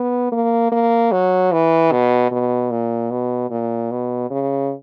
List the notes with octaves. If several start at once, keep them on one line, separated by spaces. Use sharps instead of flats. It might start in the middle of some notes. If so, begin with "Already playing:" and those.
Already playing: B3
A#3
A#3
F#3
E3
B2
B2
A#2
B2
A#2
B2
C#3